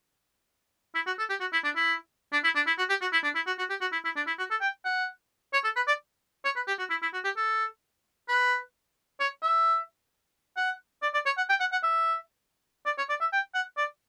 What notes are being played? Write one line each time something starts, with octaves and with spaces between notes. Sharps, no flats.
E4
F#4
A4
G4
F#4
E4
D4
E4
D4
E4
D4
E4
F#4
G4
F#4
E4
D4
E4
F#4
F#4
G4
F#4
E4
E4
D4
E4
F#4
A4
G5
F#5
C#5
A4
B4
D5
C#5
B4
G4
F#4
E4
E4
F#4
G4
A4
B4
C#5
E5
F#5
D5
D5
C#5
F#5
G5
F#5
F#5
E5
D5
C#5
D5
E5
G5
F#5
D5